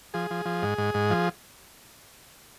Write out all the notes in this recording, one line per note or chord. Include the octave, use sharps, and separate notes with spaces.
F3 G#4
F3
F3
G#2
G#2
G#2
F3